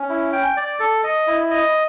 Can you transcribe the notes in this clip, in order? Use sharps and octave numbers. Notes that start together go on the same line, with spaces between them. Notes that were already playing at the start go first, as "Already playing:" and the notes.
Already playing: C#4
E4
G5
D5
A4
D#5
E4
D#5